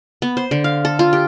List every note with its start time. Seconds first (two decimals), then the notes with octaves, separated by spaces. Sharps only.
0.22 B3
0.37 C5
0.51 D3
0.64 F5
0.85 A4
0.99 F4
1.13 G4